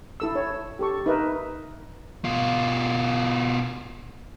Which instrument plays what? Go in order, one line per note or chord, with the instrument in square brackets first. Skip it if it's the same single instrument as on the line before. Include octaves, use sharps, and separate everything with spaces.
[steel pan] E4 A4 E6
C#5
G4 A4 C#6
D#4 A#4 B4 E5
[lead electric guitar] B2 F4